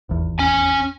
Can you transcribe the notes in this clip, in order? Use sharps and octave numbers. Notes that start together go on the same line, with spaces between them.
D#1 G#1 E2
C#4 G#5